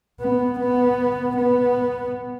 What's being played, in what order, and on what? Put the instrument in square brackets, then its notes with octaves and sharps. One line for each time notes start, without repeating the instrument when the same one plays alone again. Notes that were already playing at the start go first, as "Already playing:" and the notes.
[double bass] B3
B3
B3